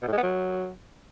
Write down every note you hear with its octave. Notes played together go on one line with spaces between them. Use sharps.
B2
A2
G#3
B3
F#3